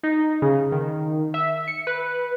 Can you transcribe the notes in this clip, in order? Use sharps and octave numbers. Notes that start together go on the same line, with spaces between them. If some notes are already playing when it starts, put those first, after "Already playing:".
D#4
C#3
D#3
E5
C#7
B4